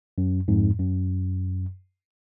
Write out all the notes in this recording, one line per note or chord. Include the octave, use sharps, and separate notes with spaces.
F#2
F2 G#2
F#2